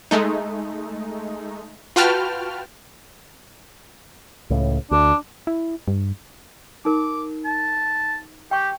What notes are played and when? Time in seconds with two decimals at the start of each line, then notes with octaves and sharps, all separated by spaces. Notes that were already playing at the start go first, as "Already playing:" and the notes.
0.11 G#3 A3 D#4
1.96 F4 F#4 B4 G5 A5 F6
4.50 C#2 A2
4.91 D2 D4
5.47 E4
5.88 G2
6.85 D#4 A#4 D6
7.45 A5
8.51 G4 G5 C#6